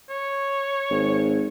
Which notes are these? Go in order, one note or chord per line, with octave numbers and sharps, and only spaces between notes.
C#5
G#1